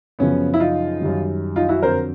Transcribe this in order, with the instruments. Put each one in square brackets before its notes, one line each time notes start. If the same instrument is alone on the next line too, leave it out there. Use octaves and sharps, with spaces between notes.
[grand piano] F#2 C#3 F3 B3 C#4
E4
D#4 F4
F#2 D#3 G3
D#4 F4
E4 F#4
F2 D3 F#3 A#4 C5